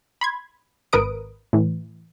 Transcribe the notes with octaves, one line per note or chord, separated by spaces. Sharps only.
B5 C6 G#6
G#1 A#4 B4 D#6 D7
A2 E3